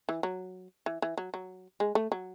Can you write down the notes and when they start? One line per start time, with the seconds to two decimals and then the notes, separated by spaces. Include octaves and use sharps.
0.09 E3
0.23 F#3
0.86 E3
1.02 E3
1.18 F#3
1.34 F#3
1.80 G#3
1.95 A3
2.12 F#3